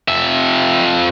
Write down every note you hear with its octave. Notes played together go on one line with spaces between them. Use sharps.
F2 E5